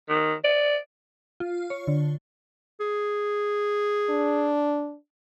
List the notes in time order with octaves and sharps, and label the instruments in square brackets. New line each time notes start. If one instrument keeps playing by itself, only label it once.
[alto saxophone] D#3
D5
[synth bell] F4
C#5
D3
[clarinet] G#4
[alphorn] D4